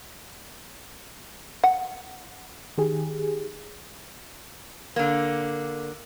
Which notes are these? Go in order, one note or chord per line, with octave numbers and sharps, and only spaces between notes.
F#5
D#3 G4 G#4
D3 A#3